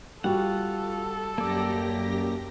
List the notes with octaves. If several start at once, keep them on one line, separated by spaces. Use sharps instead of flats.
G3 F4 F#4 A4 F#5
F#2 A#3 G4 D5 A#6